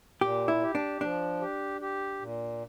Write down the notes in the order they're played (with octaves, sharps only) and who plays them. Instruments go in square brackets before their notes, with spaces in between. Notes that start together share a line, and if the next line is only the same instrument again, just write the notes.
[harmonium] A#2 [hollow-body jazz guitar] G4
[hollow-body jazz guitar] E4
[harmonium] G4
[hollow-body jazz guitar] D4
[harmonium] F3 [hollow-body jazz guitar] D4
[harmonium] G4
G4
A#2